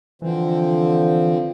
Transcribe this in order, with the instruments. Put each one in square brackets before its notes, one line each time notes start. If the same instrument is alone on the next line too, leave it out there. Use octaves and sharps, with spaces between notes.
[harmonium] D3 F3 C4 [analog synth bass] E3